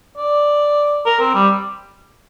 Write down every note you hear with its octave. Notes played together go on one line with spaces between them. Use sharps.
D5
A#4
C4
G3